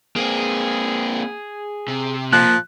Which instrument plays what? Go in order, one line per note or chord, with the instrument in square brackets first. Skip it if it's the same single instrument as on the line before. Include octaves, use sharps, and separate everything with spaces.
[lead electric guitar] A#3 C4 [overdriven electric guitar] G#4
[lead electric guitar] C3
[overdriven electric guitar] A#2 [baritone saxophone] F3 [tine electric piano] F#6